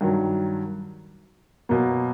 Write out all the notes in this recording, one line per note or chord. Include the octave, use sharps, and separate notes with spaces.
G2 D#3 F#3
B2 F#3 A#3